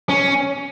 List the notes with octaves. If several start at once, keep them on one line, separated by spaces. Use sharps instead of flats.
C#4